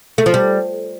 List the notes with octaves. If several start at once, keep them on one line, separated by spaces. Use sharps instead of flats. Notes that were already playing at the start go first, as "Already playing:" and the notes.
A3
F3
G3